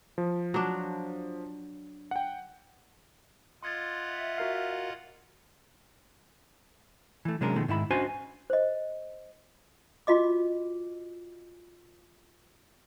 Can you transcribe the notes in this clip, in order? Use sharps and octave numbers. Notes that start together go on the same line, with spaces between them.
F3
F#3 D4
F#5 G5
F4 D#5 F#5 C6 G#6 A6
E5
F#4 A#4 F5
E3 A3
C3 F#3 G#3 C#4 D4 A#4
B2 D#3 F3 G#3 A3
G#2 D#3 E4 B5
C#4 D4 F#4 C5 D#5 G#5
C5 D#5
F4 F#4 D#5 D6